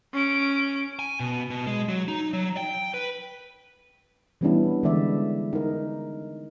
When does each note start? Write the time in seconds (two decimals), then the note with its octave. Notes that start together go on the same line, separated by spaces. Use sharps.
0.13 C#4 D7
0.99 G#5
1.20 B2
1.50 B2
1.67 G#3
1.89 F#3
2.08 D#4
2.33 F#3
2.57 G5
2.94 B4
4.41 E3 G3 B3 C#4 D4 E4
4.83 D3 E3 G#3 D5 E5
5.53 D#4 A#4